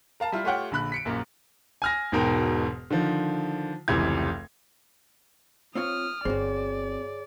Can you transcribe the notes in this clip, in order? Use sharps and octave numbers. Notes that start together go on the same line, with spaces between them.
A#4 F5 A5 A#5
G3 E4 F4
A3 F4 G4 C#5 F#5 G5
A#1 D3 B5 F#6
B6 C#7 D7
A#1 F#2 A#3
G#5 F6 A#6
E1 G#2 B2 A#4 G5
D3 D#3 F3
F1 C#2 C3 E3 G#6
C4 F4 C#5 D#6 F6
G1 C4 F#4 G#4 C#5 D5